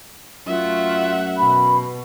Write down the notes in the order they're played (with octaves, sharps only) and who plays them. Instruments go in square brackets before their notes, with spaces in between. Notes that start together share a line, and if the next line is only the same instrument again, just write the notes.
[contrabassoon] F#2 [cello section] A3 [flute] F4 [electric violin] E5 F#5
[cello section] B2 [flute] B5